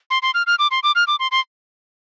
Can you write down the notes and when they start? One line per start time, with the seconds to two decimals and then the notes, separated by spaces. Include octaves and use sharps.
0.10 C6
0.22 C6
0.34 F6
0.47 F6
0.59 D6
0.71 C6
0.83 D6
0.95 F6
1.07 D6
1.20 C6
1.31 C6